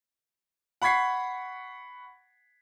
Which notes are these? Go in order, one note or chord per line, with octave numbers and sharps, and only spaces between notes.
F#5 B5 C#6 G#6 B6 C7